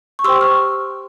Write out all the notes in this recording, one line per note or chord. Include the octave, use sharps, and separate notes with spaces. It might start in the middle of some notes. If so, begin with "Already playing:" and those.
C#6
G4 C5 G5 C6 E6
C#6 F6